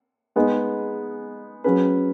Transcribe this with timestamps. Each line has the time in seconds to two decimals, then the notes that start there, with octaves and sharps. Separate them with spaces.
0.36 G#3 B3 D#4 G#4
1.64 F#3 C#4 G#4 B4